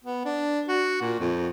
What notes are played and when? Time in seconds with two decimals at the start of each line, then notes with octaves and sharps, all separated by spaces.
0.05 B3
0.25 D4
0.69 F#4
1.01 A#2
1.20 F2